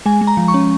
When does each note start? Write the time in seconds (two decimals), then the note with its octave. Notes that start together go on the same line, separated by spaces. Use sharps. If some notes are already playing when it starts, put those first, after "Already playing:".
0.06 G#3 G#5
0.21 G#3
0.27 A#5
0.37 F3
0.48 C#6
0.54 C#4